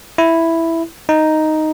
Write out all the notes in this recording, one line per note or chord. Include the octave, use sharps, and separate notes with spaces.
E4
D#4